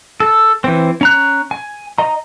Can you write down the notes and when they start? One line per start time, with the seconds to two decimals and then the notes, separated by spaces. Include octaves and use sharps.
0.20 A4
0.64 E3 C4
1.01 C#4 A#5 F#6
1.51 G#5
1.98 D#5 A#5